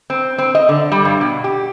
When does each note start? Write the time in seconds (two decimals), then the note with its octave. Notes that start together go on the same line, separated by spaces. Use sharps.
0.10 C4
0.38 C4
0.55 D#5
0.69 D3
0.92 G3
1.05 G2
1.21 B2
1.44 G4